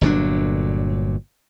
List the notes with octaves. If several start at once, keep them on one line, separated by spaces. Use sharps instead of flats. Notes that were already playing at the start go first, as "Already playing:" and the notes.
G1 A#2 F#3 D4